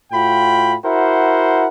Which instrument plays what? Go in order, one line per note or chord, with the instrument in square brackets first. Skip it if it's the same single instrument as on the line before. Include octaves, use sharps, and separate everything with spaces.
[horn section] A2 F4 F#4 G5 B5
E4 F#4 A#4 C5 F#5